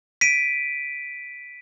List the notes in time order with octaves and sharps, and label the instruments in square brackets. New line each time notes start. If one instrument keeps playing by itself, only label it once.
[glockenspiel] B6 D7 D#7